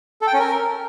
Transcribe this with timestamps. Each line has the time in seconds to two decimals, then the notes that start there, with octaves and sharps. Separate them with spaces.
0.21 A4
0.27 G5
0.33 C#4
0.39 A#4